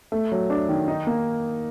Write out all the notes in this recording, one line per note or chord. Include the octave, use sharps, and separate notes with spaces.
A3
F#3
D4
D#3
D#4
A#3